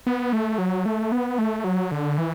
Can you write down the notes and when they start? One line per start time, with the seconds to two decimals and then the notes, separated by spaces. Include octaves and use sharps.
0.06 B3
0.33 A3
0.58 F#3
0.86 A3
1.12 B3
1.39 A3
1.64 F#3
1.92 D3
2.18 E3